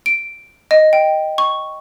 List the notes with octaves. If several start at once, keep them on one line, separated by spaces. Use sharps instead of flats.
D7
D#5
G5
C#6